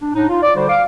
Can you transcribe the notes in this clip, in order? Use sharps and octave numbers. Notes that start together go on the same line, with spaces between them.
D4
A2 D4 D#4
F4
D5
D3 G3 F#4 C5
F5 D6